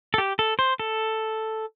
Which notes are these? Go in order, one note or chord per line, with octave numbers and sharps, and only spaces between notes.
A4
G4
A4
C5
A4